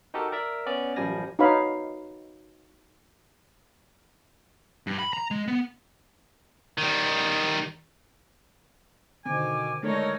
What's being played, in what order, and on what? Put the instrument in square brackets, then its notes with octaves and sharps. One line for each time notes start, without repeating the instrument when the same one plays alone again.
[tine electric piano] D#4 F#4 G4 A4 A#4
A#4 D5 E5
B3 C#4 D5
A1 F#2 F3 G3 G#5 A#6
[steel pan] D#4 F#4 B4 C#5 F5 B5
[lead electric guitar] G2
B5
A#5
G#3
B3
[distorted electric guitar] D#3 G3
[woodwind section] B2 G#5 D6 [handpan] D3 D#3 C4
[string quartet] G#3 D#4 [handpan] A3 D4 A4 [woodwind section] A#4 C#5